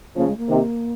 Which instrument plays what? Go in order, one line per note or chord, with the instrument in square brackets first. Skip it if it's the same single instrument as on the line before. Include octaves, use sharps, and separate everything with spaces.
[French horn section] C#3 F3 [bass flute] A#3
[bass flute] G#3
A#3
[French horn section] C3 D#3